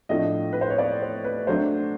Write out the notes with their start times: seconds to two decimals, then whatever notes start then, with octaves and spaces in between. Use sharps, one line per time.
0.09 A2 F3 A3 D4 D#5
0.53 B4
0.61 C5
0.70 C#5
0.78 D5
1.02 C5
1.24 B4
1.47 F#3 A3 D4 C5